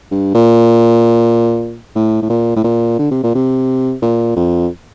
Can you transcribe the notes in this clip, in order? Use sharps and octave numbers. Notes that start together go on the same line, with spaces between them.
G2
A#2
A2
A2
A#2
A2
A#2
D3
C3
A#2
C3
A#2
F2